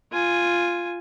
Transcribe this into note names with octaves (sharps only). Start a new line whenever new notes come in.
F4 G#5